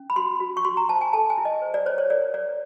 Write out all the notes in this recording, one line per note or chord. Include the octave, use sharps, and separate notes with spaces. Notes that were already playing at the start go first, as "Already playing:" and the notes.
Already playing: C#4
B5
F#4 C6
F#4
C#6
F#4 C6
A#5
C5 A5
G#5
A4 A5
G#5
E4
D#5
C5
D5
C5 C#5
C#5
A#4 D5
C#5 D5